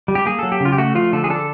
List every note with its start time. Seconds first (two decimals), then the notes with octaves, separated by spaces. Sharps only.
0.08 G3
0.15 G4
0.25 A#3 G#4
0.39 F#3 A4
0.52 G4
0.60 C#3
0.65 F4
0.72 G4
0.78 A3 F#4
0.95 F3 F4
1.13 D3 A4
1.24 G#4
1.30 D4 A4